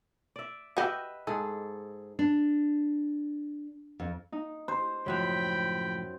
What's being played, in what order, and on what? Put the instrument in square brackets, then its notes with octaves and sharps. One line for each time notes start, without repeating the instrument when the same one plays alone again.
[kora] D5 E5
[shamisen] F#4 G4 [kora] B4 D#5 E5
[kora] G#2 G#4 A4
[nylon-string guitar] D4
F2
[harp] D#4
[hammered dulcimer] C5
[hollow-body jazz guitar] C#2 A2 F3 [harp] F#2 F#6 [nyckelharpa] G5 B5